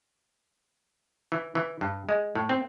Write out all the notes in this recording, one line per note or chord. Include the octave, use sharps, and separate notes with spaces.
E3
E3
G2
G#3
A2
C4